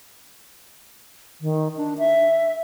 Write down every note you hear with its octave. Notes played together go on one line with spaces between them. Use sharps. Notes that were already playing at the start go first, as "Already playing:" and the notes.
D#3
D4
E5